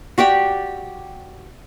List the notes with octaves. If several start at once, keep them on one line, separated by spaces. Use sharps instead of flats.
F#4 G4 D5 G5